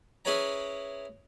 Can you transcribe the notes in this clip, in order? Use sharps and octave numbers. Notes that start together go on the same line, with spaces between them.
C#4 E4 G#4 B4 C#5 A#5